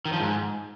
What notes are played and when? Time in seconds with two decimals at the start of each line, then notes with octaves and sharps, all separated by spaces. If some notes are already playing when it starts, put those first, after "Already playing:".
0.05 D#3
0.13 F3
0.20 G#2